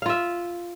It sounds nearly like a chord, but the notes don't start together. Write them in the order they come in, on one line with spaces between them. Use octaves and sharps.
F5 F4 E5